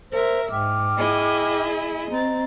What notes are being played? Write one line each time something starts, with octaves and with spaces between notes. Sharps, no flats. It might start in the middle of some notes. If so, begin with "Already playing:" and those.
A#4 C5 E5
G#2 G5 D6 F6
E4 G#4 D#5
C4 D#5 A#5 A6